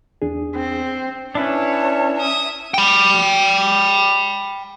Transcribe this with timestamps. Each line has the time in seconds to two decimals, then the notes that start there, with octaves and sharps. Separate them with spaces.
0.22 E2 D4 G#4
0.55 C4
1.35 C#4 D4 E4 B4 C#5 A5
2.17 E5 D#6
2.74 G5 B5